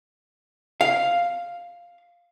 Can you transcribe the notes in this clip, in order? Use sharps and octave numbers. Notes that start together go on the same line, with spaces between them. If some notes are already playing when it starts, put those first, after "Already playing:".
F5